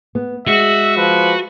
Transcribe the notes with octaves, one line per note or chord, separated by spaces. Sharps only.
B3
G#3 F#4 E5
F3 B4